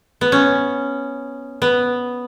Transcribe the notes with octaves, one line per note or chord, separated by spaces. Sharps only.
B3
C#4
B3